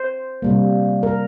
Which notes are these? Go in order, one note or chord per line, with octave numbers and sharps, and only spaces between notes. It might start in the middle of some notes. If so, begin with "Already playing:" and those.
Already playing: C5
C3 G3 A#3
A#4